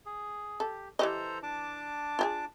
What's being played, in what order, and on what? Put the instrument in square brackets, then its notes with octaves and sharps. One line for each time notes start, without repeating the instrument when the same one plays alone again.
[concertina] G#4
[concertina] G4 [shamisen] A4
[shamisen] E3 G4 D#5 [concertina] A4 C5 A#5
[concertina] D4 A5 D6
[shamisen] F4 G4 G#4